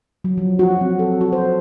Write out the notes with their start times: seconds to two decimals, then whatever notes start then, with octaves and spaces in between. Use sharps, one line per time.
0.24 F#3
0.38 F3
0.59 F#4
0.81 C4
0.99 A4
1.21 F#4
1.32 C5